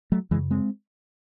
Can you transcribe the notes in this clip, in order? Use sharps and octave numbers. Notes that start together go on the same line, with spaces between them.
F#3 A3
F#2 C#3 E3 G#3
G#3 C4